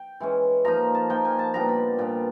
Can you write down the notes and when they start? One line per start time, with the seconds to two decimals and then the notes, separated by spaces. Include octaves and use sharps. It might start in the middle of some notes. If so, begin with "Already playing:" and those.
Already playing: G5
0.20 E3 G#3 C#4
0.65 F3 A#3 D#4 A#5
0.95 A5
1.10 F3 A#3 D#4 G5
1.25 G#5
1.39 A5
1.54 A#2 G3 B3 D4 A#5
1.69 B5
1.98 A#2 G3 B3 D4